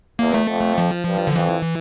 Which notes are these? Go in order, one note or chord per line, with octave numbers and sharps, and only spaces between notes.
E2 A#3
A3
F2
F3
G2
D3
F2 E3